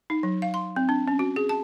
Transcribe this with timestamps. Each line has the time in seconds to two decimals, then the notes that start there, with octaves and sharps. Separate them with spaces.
0.10 D#4
0.23 F#3
0.42 F5
0.54 C6
0.76 C4
0.89 D4
1.08 C#4
1.19 F#4
1.36 G#4
1.49 A5